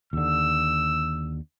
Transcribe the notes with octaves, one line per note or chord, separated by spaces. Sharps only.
D#2 D3 E6